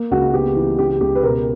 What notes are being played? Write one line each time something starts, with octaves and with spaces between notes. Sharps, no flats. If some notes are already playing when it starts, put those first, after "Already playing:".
Already playing: A#3
C#2 F#4
B3 G4
E3
C#2 G4
C#2 G4
B4
B2 A#4